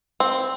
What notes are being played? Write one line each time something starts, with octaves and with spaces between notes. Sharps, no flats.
C4